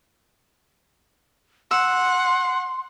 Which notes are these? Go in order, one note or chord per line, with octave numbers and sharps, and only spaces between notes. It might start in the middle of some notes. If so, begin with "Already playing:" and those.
F#5 C6 E6